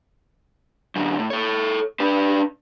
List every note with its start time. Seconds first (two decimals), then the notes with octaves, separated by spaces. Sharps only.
0.96 F#2 D3
1.19 A2
1.30 A4 C#5
2.00 D4 B4